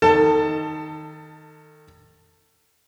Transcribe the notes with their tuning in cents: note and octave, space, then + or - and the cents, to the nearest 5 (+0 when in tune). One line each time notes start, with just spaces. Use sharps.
D#3 +0 A4 +30 A5 +15